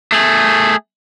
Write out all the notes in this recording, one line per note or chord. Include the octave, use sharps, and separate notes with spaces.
A3 G#4